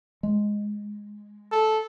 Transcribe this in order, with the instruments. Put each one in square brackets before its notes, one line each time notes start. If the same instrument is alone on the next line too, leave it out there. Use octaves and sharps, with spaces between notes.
[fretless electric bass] G#3
[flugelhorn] A4